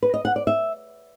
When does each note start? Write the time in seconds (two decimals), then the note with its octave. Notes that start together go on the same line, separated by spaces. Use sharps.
0.02 B4
0.14 D#5
0.25 F#5
0.36 D5
0.47 E5